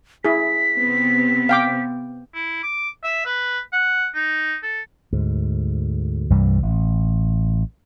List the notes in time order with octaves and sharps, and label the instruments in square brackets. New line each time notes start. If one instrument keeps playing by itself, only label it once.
[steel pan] E4 G#4 [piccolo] B6
[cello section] C3 B3 C4
[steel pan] F5 G5 D6
[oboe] E4
D6
E5
B4
F#5
D#4
A4
[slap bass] D2 G#2
C2 G2 E3 G3
A1